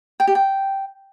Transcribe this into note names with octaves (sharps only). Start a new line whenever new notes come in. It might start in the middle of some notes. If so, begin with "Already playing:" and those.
G5
G4
G5